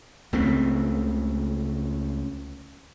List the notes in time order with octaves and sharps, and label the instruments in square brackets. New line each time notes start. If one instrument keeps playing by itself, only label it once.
[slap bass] C#2 C#3 A3 C4